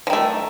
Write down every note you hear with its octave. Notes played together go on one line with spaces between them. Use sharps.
D#3 F3 A3